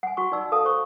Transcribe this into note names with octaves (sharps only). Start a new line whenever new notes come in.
F#5 G#5
F#4 C#6
D#4 D5 E6
A4 F5 A5 D#6
C5 C#6